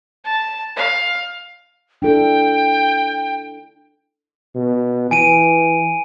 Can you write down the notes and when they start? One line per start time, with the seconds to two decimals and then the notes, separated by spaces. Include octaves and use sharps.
0.25 A5
0.76 F5
2.02 D4 E4 A4 G5
4.55 B2
5.11 E3 G#5 D7 D#7